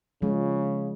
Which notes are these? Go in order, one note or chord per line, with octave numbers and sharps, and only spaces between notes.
C#3 F3 G#3